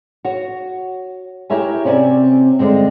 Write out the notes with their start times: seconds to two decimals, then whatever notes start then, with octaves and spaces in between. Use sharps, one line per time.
0.25 F#4 C#5
1.50 E4 G4 A#4 C#5 E5 G#5
1.85 C3 C4 C#4 D5 G5 G#5
2.59 G2 D3 G#3 C4